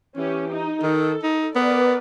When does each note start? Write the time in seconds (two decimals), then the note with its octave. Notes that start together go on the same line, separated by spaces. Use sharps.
0.17 E3 C#4 G4
0.52 D#4
0.82 D#3 A4
1.23 D#4
1.55 B3 A#4 B4 D5